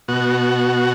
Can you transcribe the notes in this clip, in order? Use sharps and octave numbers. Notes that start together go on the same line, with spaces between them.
B2 F#4